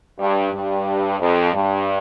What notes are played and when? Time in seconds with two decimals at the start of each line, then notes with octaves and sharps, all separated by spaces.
0.19 G2
0.53 G2
1.20 F2
1.53 G2